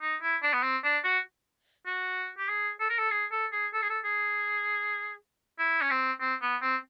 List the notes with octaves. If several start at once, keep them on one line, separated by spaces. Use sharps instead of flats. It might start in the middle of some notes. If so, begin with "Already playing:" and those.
D#4
E4
D4
B3
C4
D4
F#4
F#4
G4
G#4
A4
A#4
A4
G#4
A4
G#4
A4
G#4
A4
G#4
E4
C#4
C4
C4
B3
C4